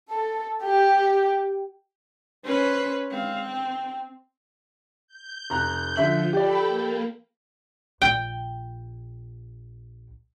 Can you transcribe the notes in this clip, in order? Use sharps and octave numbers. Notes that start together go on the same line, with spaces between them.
A4
G4
C#4 B4 C5
G#3 C4 F5
G5
G6
F1 A#5 F#6
D3 F3 E5 F#7
G4 A4 D5 G5 B5
A#3
A#1 G5